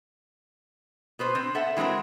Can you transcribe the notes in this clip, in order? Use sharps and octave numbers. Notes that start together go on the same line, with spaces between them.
B2 B4 C5
C4
A4 E5 F#5
E3 G#3 C4 F#4 A#4